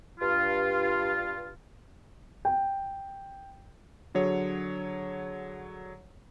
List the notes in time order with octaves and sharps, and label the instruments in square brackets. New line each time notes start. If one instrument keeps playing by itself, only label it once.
[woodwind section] G2 F4
[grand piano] G5
[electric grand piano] D3 F#3 G#4 C#5